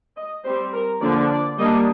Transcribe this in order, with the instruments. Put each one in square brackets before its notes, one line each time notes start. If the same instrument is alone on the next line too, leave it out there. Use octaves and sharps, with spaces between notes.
[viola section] D#5
G3 C4 C5
A#4
D3 F3 A#3 D4 D5
D5
G3 A#3 D4 D#5